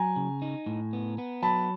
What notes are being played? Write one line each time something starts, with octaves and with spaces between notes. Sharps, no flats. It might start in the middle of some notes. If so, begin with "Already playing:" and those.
Already playing: F#3 G#5 A#5
C#3
D#4
A2
B3
B3
F#3 A5 B5